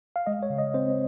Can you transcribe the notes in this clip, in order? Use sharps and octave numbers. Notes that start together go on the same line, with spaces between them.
F5
G#3 D#5
C#5
C#3
D#5
C4 C5